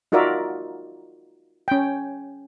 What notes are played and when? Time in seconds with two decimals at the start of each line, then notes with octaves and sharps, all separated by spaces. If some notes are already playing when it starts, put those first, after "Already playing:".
0.12 D#4 F4 F#4 A#4 D5 E5
1.68 C#4 G5